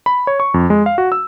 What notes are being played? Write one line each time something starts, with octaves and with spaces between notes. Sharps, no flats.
B5
C#5
C#6
F2
G#3
F5
F#4
E6